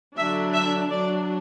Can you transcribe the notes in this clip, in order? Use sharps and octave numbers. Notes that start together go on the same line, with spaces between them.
D3 F#3 D4 E5
E5
F#3 D4 D5